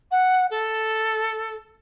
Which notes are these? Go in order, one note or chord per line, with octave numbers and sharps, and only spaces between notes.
F#5
A4